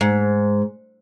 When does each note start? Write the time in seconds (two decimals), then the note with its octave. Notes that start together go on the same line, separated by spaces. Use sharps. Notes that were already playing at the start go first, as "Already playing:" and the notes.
0.01 G#2